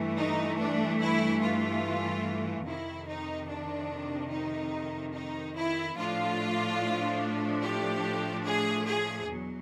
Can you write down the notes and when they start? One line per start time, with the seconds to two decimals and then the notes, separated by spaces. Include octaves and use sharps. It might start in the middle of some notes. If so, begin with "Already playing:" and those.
Already playing: G2 E3 A3
0.16 D#4
0.58 D4
1.00 E4
1.41 F4
2.65 F2 C3 D#3 E4
3.07 D#4
3.48 D4
4.30 D#4
5.13 D#4
5.55 E4
5.96 A2 F3 A3 D4 F4
7.62 G4
8.44 G#4
8.85 G#4
9.28 E2 B2 F#3